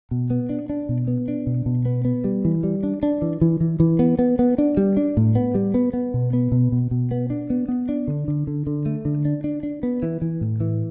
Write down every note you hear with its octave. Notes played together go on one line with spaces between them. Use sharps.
B2
B3
D4
D4
B2
B3
D4
B2
B2
B3
B3
G3
E3
G3
D4
D4
E3
E3
E3
E3
B3
B3
B3
D4
G3
D4
A2
B3
G3
B3
B3
B2
B3
B2
B2
B2
B3
D4
B3
B3
D4
D3
D3
D3
D3
A3
D3
D4
D4
D4
B3
E3
E3
A2
E3